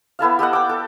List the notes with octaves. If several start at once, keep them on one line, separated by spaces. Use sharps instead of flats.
B3 E4 A4 F5
G4 A4 D#5 F#5
G5 D6
A4